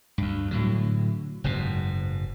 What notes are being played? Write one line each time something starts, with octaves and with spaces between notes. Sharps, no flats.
D2 G2
A2 D3 F#3
F#1 G#2 B2